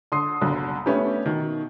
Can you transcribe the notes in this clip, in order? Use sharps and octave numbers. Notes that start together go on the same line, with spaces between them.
D3 C6 D#6 C7
F#1 B1 D3
A3 B3 C#4 D4 G4
B2 D#3